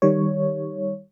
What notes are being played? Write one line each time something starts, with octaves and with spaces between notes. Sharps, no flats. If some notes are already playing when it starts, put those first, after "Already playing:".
D#3 G3 C#5